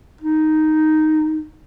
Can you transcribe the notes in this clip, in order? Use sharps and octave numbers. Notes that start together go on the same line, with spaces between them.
D#4